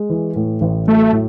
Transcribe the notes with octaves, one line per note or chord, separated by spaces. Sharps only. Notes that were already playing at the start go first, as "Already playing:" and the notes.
Already playing: G#3
E3
A2
A1
F#3 A3
A2